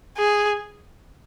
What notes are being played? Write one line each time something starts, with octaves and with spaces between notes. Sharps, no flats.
G#4